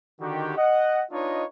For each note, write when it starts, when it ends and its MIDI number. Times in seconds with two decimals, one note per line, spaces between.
0.21 0.53 50
0.21 0.53 51
0.21 0.53 66
0.21 0.53 67
0.57 1.03 75
0.57 1.03 78
1.11 1.43 62
1.11 1.43 63
1.11 1.43 65
1.11 1.43 71
1.11 1.43 73
1.11 1.43 75